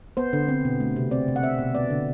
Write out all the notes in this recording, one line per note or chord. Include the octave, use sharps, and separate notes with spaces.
B3 C5
D3
C4
B2
A3
C3
C4 D5
C3
F#5
C4 E5
B2
B3 D5
D3